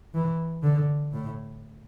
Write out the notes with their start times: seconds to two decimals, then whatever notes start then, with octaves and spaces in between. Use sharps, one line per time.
0.14 E3
0.63 D3
1.12 A2